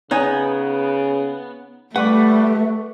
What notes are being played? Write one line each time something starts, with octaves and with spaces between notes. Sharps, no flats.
C#3 B3 D#4 C#5 G#5
G3 A3 B4 F#5 C#6 D6